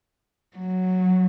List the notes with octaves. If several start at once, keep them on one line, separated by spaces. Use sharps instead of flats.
F#3